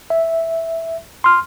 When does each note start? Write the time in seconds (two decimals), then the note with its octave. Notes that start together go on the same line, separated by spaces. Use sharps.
0.10 E5
1.24 C6 F6